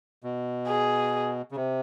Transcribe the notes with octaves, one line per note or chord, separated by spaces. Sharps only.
B2
G#4
C#3
C3